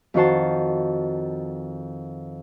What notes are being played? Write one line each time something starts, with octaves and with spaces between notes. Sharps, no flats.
F2 D#3 F#4 C5 A5